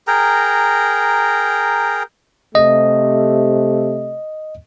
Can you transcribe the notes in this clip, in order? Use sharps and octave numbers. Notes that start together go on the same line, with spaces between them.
G#4 A#4 G5 A#5
C3 A3 D#5